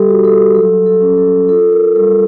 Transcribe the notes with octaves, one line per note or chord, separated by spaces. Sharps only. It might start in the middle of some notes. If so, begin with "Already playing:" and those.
Already playing: G3 G4 A4
F#4
A4
F#3 A4
A4
C#4
A4
F4 A4
A#4
G3 A4